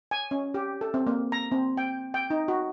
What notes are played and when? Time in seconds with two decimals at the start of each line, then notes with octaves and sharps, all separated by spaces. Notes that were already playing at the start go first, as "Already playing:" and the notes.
0.11 G#5
0.31 C#4
0.54 G4
0.81 A4
0.94 C4
1.07 A#3
1.32 A#5
1.51 C4
1.77 G5
2.14 G5
2.30 D#4
2.48 F#4